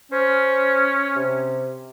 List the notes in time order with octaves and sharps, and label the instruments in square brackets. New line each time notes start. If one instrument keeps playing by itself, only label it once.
[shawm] C#4 [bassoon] C5
[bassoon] C3